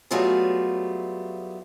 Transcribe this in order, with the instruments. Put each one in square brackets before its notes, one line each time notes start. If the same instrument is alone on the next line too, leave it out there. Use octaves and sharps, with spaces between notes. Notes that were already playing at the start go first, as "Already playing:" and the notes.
[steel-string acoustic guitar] F#3 G3 A3 B3 F4 G#4